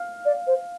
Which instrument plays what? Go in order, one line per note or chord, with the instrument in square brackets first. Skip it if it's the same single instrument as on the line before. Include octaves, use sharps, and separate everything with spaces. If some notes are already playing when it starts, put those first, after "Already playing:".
Already playing: [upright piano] F5
[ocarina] D5
C5